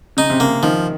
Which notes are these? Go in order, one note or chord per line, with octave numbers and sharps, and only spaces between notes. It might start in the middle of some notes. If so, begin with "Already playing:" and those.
C#3 D#4
C3
C#3 A#3
D#3 F3